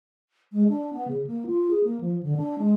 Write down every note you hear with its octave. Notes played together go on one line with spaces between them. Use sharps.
G#3
D4
B3
C#3
A#3
F4
G#4
A#3
F3
D3
D4
G#3